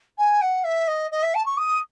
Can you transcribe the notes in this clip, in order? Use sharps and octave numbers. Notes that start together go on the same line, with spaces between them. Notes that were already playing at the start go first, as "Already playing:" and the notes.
G#5
F#5
E5
D#5
D#5
E5
A5
C#6
D#6